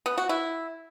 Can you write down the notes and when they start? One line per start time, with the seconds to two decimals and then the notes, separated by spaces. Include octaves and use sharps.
0.06 B3
0.18 F#4
0.29 E4